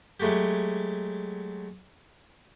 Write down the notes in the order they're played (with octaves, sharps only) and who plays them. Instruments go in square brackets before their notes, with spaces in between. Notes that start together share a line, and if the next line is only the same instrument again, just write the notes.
[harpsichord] F#3 G#3 A3 F#4 G4